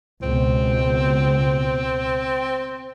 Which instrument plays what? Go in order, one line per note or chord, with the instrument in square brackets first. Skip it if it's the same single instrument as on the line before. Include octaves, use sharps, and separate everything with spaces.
[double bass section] C#2 B2 [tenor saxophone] C4